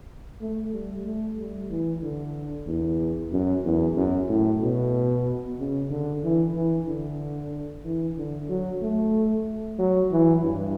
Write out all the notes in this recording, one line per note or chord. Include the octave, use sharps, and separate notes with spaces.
A3
G3
A3
G3
E3
D3
E2
F#2
E2
F#2
A2
B2
C#3
D3
E3
E3
D3
E3
D3
F#3
A3
F#3
E3
G2